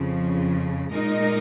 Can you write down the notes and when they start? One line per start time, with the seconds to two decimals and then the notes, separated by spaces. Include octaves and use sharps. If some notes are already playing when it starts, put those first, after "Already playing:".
Already playing: F2 C#3 F3
0.90 A#2 G#3 D#4 A#4 D#5